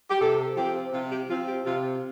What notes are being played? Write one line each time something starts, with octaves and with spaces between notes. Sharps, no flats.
G4
C3 A4
F3 C4 G4
C3 F4
G4
F3 C4 F4
G4
C3 F4